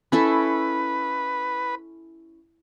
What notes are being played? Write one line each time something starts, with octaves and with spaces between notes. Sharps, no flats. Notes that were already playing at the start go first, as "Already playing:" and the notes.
C#4 E4 A4 B4